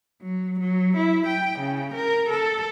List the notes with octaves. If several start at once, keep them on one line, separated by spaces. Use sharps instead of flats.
F#3
F#3
E4
G5
C#3
A#4
A4